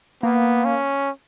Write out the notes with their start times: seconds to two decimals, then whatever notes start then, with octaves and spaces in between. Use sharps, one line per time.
0.23 A#3 B3
0.65 C#4